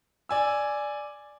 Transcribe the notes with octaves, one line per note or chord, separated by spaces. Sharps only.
D5 G#5 E6